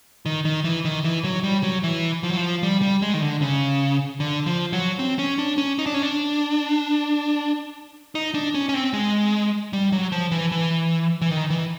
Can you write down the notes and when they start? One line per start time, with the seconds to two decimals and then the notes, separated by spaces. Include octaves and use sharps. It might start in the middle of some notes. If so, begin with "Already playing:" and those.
0.26 D#3
0.45 D#3
0.64 E3
0.85 D#3
1.04 E3
1.24 F#3
1.44 G3
1.63 F#3
1.83 E3
2.23 F3
2.30 F#3
2.37 F3
2.63 G3
2.82 G3
3.02 G#3
3.14 D#3
3.22 D3
3.41 C#3
4.20 D3
4.46 F3
4.73 F#3
4.99 C4
5.19 C#4
5.38 D4
5.58 C#4
5.79 D#4
5.86 D4
5.94 C#4
6.03 D4
8.15 D#4
8.34 D4
8.55 C#4
8.69 C#4
8.74 C4
8.93 G#3
9.73 G3
9.92 F#3
10.12 F3
10.32 E3
10.52 E3
11.22 E3
11.31 D#3
11.50 E3